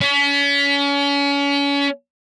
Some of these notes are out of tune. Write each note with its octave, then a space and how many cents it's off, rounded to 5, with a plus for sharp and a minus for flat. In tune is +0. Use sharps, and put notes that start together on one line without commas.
C#4 +35